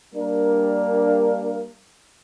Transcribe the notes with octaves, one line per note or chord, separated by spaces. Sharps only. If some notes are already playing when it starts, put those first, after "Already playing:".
G3 A#3 D4 A#4